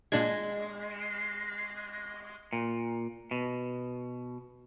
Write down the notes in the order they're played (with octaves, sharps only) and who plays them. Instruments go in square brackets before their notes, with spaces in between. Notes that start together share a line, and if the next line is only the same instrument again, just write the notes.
[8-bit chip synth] A#2 D4 G#6 [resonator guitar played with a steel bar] G#3
[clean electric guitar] A#2
B2